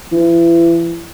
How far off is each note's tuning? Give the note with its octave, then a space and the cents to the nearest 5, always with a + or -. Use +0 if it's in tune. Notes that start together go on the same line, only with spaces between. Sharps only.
E3 +35